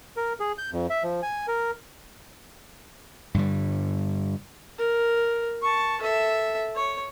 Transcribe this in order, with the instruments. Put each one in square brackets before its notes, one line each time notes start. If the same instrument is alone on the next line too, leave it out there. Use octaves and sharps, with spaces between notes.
[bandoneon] A#4
G#4
G6
F2
E5
F3
G#5
A#4
[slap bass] G2 D3 G3
[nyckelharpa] A#4
A5 C#6
A4 E5
C#5